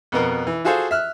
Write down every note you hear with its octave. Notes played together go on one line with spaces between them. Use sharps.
F2 B2 B3 A#4
E3
F4 F#4 G#4 A4 C5 F5
E5 F6 F#6